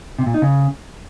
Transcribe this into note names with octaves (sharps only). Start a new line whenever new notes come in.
C3
A#2
D#4
C#3